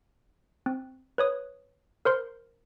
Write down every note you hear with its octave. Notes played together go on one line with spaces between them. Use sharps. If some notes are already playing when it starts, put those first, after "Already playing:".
C4
B4 C#5 D#6
A#4 C5 C6